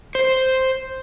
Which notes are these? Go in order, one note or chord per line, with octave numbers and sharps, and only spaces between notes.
C5